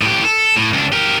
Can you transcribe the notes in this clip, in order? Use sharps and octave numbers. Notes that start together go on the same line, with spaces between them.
A2 G4
A4
A2
C#2 D4
G4 A#4